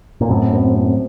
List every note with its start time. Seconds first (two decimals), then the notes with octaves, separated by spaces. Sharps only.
0.21 A#2
0.29 F#2 A2 C4
0.53 C4
0.75 C4